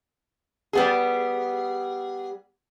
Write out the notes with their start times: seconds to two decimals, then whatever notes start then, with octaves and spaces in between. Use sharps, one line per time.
0.73 G3 B3 G#4